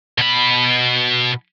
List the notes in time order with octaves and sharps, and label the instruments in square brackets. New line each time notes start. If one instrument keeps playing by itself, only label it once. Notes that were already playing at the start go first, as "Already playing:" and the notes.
[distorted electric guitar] B2 B5